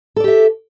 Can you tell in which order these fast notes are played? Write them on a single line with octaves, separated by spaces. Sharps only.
A4 D5 G4 E5